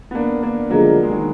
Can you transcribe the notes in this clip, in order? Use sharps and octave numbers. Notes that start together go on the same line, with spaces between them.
B3
A#3 D4
A#3 D4
D3 F3 F#3 G#3 A#3
G#3
D#3 F#3